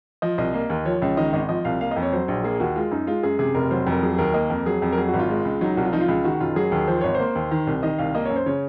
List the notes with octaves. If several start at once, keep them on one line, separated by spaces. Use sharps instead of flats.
F3 D#5
C2 D#5
A#3
D#2
F3 C#5
C#2
D#3 D#5
G#1 D#5
F3 D#5
C2 F5
A#3 F5
F2 D#5
C#5
F#3 C5
A#1
A#3 G#4
D#2 F#4
G#3 F4
F#2 D#4
G#3 F4
F#2 G#4
C3 G#4
F1 A#4
F#3 C5
F2
A#4
F#3 G#4
G#4
D#2 A#4
A#3 D#5
F2 A#4
F#3 G#4
F2
A#4
F#3 G#4
F#4
G#1
F4
G#3
C#2
F#3 D#4
C2 F#4
F4
F3 D#4
F4
C#2
D#3 F#4
F#1 F4
F#3 G#4
D#2
F3 C5
G#1 C#5
A#3 C5
D#2
D#3
C2
D#3 D#5
C2 F5
A#3 D#5
C#5
F#2
C5
C#3 C#5